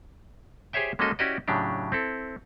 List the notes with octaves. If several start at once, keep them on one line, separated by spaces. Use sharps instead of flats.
G4 G#4 C5 C#5 E5 G5
G#3 A#3 C#4 F#4 A4 D#5
C#4 E4 F#4 G4 D5 D#5
A2 C#3 F#3 D4 G4
C4 E4 A4